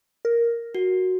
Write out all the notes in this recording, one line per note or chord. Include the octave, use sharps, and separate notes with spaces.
A#4
F#4